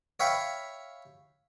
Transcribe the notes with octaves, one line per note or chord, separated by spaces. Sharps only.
C#5 E5 F5 G5 B5 C#6